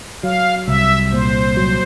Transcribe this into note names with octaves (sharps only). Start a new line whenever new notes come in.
F#3 F5
C2 E5
A#2 C5
F#3